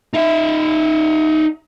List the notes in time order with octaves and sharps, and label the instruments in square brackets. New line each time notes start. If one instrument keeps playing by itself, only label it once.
[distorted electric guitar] D#4 E5